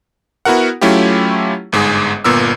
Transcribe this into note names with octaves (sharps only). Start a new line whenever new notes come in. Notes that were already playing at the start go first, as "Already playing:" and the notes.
B3 E4 F#4 A#4 F#5
F#3 A3 C#4 E4 F4 G4
G1 G#2 G#3 G#4
G1 A#2 B3 A#4 E6